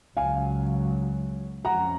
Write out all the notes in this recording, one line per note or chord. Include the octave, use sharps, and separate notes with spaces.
C#2 C#3 F#3 F5 G#5
F2 F3 G#3 C#4 F#5 A#5